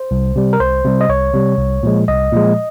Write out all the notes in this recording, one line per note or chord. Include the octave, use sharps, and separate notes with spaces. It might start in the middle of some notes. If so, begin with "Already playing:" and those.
Already playing: C5
C2
C3 G3
A#4
C2 C5
C3 G3
D#5
C2 C#5
C3 G3
C2
A#2 F3 G#3
C2 D#5
A#2 F3 G#3